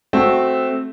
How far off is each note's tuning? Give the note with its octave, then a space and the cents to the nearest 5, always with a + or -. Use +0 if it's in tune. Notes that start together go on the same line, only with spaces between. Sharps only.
A3 -10 C4 +0 F#4 +0